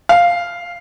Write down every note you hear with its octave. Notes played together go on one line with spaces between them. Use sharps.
F5